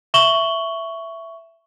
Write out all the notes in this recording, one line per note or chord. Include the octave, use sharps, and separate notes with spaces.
E5 C#6 E7 F#7 G7